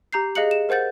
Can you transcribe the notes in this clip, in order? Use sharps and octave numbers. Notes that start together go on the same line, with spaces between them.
G4 A#5 G6 C7
G#4 D#5 F5 F#6 C#7 F#7
E7
A#4 C5 F#5 G6 A6